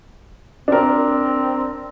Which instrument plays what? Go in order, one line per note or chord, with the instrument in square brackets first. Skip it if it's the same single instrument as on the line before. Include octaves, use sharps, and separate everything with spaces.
[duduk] C4 [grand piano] D4 A#4